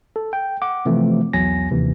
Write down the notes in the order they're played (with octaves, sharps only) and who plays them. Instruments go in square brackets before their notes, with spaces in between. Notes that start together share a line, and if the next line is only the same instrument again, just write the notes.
[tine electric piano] A4
G5
F#5 D6
C3 E3 F3 A3 C4
B1 E2 F#3 G#5 A#6
D#2 C3 E3